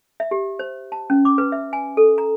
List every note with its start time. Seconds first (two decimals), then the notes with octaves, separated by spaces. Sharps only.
0.20 E5
0.31 G4
0.59 C5
0.92 A5
1.10 C#4
1.25 D6
1.38 B4
1.52 E5
1.73 G#5
1.97 A4
2.18 A#5